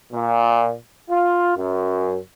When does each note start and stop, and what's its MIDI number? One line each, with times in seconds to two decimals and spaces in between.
0.13 0.74 46
1.10 1.54 65
1.56 2.18 42